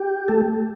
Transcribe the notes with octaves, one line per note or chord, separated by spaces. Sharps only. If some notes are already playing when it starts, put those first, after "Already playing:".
Already playing: G4
A3 A4